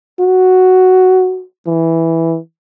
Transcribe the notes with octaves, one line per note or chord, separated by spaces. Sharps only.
F#4
E3